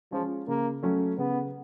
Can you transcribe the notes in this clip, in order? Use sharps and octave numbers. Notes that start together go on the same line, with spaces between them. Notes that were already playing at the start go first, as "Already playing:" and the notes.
F3 G#3 C#4 F4
C#3 A#3
F#3 A3 C#4
C#3 B3